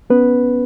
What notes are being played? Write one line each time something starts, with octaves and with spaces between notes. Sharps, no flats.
B3 C#4 B4